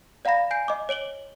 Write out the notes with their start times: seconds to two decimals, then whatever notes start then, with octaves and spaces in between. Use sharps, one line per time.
0.25 D5 F5 F#5 A#5 B5 A#6
0.51 G#5 G6 C7 D7
0.68 D#5 D6
0.89 C#5 D7 F#7 G7